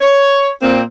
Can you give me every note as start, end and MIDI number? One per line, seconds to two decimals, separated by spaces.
0.01 0.51 73
0.62 0.82 46
0.62 0.82 58
0.62 0.82 60